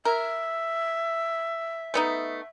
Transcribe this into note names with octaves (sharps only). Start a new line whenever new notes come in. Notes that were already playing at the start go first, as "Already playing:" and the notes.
A#4 E5
A3 B3 D#4